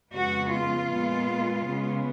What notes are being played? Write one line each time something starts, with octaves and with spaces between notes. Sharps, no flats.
F2 C#3 G#3 B3 F#4
F4
A#2 G#3 B3
C#3 G#3 B3